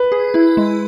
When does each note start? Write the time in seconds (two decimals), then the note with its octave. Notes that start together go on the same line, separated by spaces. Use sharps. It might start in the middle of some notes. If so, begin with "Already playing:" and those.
Already playing: B4
0.12 G#4
0.34 E4
0.57 G#3